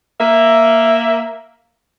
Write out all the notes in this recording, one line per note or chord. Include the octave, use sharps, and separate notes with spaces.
A#3 E5